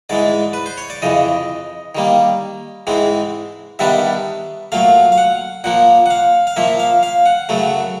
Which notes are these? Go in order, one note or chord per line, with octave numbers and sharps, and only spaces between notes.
G#2 E3 G#3 D5
B4
C5
C#5
D5
F2 C#3 E3 D#5
D#3 G3 A#3
G#2 E3 G#3 C4
G2 D#3 G3 B3 D4 E5
A#2 F#3 A3 F5
F5
F#5
A#2 F3 A#3 F#5
F#5
F5
F5
A#2 F3 A#3 E5
F5
F5
F#5
F#2 C#3 F#3 A3